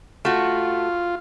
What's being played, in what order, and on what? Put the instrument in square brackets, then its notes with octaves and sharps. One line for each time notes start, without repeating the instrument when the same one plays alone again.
[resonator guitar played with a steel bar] A3 F#4 [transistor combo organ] F4